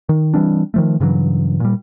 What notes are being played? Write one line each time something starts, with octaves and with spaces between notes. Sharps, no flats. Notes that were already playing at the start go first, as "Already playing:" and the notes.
D#3
E3 G3 C4 D4
D#3 F3 A3
G2 C#3 E3 F#3
A#2 G3